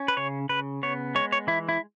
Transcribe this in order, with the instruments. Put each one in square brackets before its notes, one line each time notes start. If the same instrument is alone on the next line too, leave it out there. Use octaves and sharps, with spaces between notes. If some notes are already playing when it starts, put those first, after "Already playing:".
Already playing: [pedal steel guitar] C#4
B4
C#3 C#5
C#3 B4
B3 C#5
G#3 C#5
C#5
E3 E4
E4